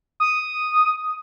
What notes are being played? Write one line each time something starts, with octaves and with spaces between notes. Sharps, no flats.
D#6